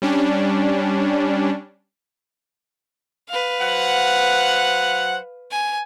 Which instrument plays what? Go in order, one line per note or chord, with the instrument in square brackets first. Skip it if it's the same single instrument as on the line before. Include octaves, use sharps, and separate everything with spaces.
[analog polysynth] G3 C#4 D4
[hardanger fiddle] B4 F5
[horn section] F#3 C5 F#5
[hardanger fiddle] G#5